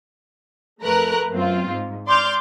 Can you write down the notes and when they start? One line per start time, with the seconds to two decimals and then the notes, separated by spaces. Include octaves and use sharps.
0.83 F2 A3 A#4 B4 A#5 F#6
1.32 F#2 C4 F4
1.68 G#2
2.06 D5 C6 D6 F6 G6